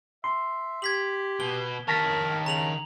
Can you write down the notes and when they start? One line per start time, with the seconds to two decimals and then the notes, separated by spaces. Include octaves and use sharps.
0.24 E5 C6
0.82 G4 G#6 B6 F#7
1.40 B2 G7
1.88 D#3 A#4 C#5 A5 A#6 B6
2.46 C#3 A#5 F7 F#7